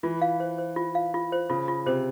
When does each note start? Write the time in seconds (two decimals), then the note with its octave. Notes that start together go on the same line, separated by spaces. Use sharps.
0.03 E3 F4
0.22 F5
0.40 C5
0.58 C5
0.76 F4
0.95 F5
1.14 F4
1.32 C5
1.50 C#3 F4
1.68 F4
1.86 C3 C5